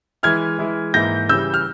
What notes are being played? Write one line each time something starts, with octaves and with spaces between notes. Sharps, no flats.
E3 G#3 E4 F6 G#6
E3 G#3 E4
G#2 E3 A#3 E4 G6 A#6
C#3 E3 G3 C#4 E6 G6
F6